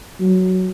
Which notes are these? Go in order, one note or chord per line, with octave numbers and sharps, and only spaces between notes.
F#3